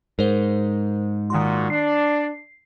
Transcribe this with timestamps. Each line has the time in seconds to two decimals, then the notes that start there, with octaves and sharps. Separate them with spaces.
0.19 G#2 A#4 C5
1.30 A#2 D#3 F#4 C6
1.70 D4 C7